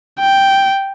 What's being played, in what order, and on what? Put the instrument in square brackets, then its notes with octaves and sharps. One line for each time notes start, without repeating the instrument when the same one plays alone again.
[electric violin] G5